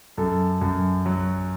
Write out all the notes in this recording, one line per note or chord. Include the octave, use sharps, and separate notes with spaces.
F#2 A4
F#2
F#3